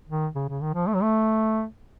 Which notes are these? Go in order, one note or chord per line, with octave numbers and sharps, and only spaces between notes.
D#3
C#3
C#3
D#3
F3
A3
F#3
A3